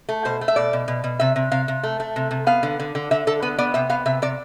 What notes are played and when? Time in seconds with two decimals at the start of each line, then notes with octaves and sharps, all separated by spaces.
0.09 A3
0.25 B2 C5
0.41 A3
0.48 E5
0.56 B2 D5
0.73 B2
0.88 B2
1.04 B2
1.20 C3 E5
1.36 C3
1.51 C3 F5
1.68 C3
1.83 A3
2.00 A3
2.16 C3
2.31 C3
2.47 B3 F5
2.63 D3
2.80 D3
2.95 D3
3.11 D3 E5
3.27 D3 A4
3.42 B3 B4
3.58 B3 D5
3.74 C3 E5
3.89 B3 F5
4.06 C3 E5
4.22 C3 D5